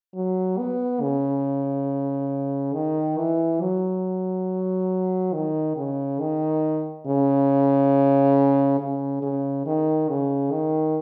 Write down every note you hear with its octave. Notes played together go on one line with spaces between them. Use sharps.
F#3
B3
C#3
D#3
E3
F#3
D#3
C#3
D#3
C#3
C#3
C#3
D#3
C#3
D#3